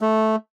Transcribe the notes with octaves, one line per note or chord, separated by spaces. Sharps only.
A3